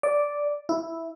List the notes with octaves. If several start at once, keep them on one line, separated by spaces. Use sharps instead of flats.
D5
E4